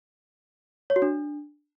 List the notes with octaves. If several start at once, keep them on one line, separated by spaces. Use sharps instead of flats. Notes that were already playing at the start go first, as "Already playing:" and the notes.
C#5
F#4
D4